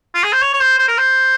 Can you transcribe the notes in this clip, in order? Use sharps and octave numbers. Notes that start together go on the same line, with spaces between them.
F4
G#4
C5
C#5
C#5
C5
C5
A#4
C5